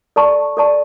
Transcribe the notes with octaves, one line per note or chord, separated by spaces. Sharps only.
A4 D5 A5 C#6
A4 D5 A5 C#6